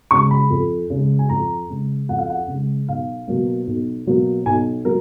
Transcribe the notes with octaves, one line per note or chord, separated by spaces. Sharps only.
C#3 G#3 C#6
B5
F2
C#3 G#3
G#5
F2 A#5
C#3 G#3
F2 F#5
F5
F#5
C#3
G#3
B1 F5
B2 F#3 A#3
B1
B2 F#3 A#3
B1 G#5
F#3 A#3 A#4